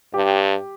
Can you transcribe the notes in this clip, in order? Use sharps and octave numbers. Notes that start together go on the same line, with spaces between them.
G2 G4